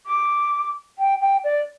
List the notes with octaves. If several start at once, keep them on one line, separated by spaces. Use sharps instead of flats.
D6
G5
G5
D5